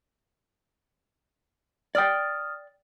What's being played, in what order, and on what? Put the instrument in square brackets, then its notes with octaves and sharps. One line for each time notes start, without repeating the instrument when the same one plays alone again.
[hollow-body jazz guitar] D5 G5 [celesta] D#6 F6 A6